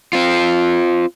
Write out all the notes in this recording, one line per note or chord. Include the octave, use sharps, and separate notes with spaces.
C4 F4